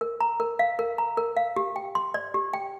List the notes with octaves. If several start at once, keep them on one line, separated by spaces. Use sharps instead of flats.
A#4
A#5
A#4
F5
A#4
A#5
A#4
F5
G4
G5
C6
D5
G4
G5